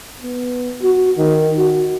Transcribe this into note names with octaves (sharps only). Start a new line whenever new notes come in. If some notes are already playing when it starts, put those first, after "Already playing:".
B3
F#4
D#3
F#4